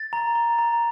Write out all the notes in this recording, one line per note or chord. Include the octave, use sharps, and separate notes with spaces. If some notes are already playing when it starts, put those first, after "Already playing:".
Already playing: A6
A#5
A#5
A#5